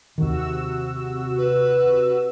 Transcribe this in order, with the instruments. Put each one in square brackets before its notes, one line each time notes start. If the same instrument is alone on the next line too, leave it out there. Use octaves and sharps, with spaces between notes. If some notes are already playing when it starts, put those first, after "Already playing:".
[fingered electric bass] D#2 D#3 [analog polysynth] C3 F#4 E6
[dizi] B4